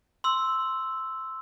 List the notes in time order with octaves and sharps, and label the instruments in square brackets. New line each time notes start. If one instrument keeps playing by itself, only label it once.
[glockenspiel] C6 E6